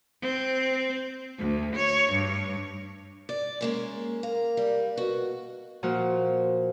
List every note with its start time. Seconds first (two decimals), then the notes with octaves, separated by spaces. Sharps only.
0.22 C4
1.39 D2
1.76 C#5
2.12 G2
3.29 D5
3.61 G#3 A#3 C#4
4.23 A#3 A#5
4.57 G3
4.97 B2 F#4
5.83 A#2 F3 F4 F#4